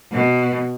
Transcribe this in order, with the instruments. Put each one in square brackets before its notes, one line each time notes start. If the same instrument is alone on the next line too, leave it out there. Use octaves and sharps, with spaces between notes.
[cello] B2